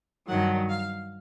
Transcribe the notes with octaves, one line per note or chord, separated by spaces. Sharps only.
G2 D#3 F#3 F#5
F5